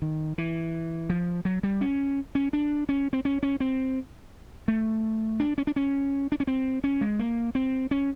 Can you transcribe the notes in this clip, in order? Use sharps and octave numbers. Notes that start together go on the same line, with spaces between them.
D#3
E3
F3
F#3
G3
C#4
C#4
D4
C#4
C4
C#4
C#4
C4
A3
D4
C#4
D4
C#4
D4
C#4
C4
C#4
G#3
A#3
C4
C#4